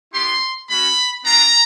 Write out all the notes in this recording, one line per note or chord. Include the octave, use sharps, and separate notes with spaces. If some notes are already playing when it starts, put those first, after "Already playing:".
B3 E4 G4 C6
G#3 C#4 F#4 B5
B3 D4 F4 A#5